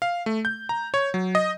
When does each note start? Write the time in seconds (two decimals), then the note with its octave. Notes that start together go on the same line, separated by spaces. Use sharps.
0.02 F5
0.26 A3
0.45 G6
0.69 A#5
0.94 C#5
1.14 F#3
1.35 D#5